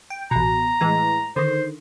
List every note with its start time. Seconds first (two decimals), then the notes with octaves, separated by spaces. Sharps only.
0.10 G5
0.31 A1 B2 A#5
0.81 A2 E3 G#3
1.36 D3 D#3 C5